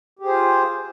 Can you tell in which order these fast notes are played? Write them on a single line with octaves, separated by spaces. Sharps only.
G4 G#4 C5 F4